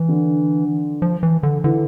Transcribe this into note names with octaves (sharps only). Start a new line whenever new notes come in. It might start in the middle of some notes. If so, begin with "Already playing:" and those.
Already playing: E3
D3
F3
E3
D3
D3 E3